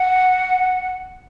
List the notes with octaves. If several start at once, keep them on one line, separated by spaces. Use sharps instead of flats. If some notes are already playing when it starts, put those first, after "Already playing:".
Already playing: F#5